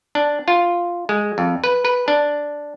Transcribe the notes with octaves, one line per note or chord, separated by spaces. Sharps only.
D4
F4
G#3
F2
B4
B4
D4